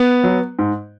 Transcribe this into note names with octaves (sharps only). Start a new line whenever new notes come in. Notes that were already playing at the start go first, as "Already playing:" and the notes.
Already playing: B3
F#3
G#2